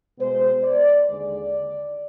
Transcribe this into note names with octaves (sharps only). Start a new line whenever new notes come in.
B2 G#3 B3 C5
D5
D#2 D3 G#3 D5